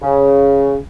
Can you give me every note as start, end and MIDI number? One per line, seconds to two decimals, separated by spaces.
0.02 0.76 49